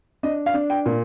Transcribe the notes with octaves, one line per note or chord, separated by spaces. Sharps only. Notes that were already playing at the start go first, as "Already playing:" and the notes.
D4 D#5
F5
D4
G5
A#2